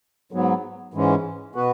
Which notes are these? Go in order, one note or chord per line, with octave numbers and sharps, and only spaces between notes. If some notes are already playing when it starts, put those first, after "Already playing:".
G#2 F#3 B3
G#2 E3 G#3 C#4
B2 B3 F#4 B4